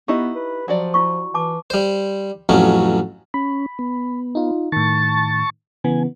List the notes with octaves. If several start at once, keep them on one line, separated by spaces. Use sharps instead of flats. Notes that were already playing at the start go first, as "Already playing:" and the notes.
B3 D#4 E4 G4 D#5
B4
F3 F#3 F#4 D5
E4 F4 C#6
E3 A5 D6
G3 C5
A1 F2 F#3 C#4
C#4 B5
B3
D#4 F4
A2 D#3 A5 C#6 A6
C#3 E3 B3 G#5